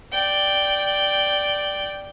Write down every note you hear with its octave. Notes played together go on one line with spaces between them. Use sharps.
D5 G5